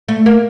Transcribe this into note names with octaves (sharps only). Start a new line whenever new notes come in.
A3
A#3